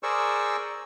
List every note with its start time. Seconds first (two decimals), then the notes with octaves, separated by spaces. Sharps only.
0.03 G#4 A#4 C5 D5 C#6 E6